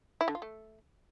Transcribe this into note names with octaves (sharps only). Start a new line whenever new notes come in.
E4
D3
F4
A3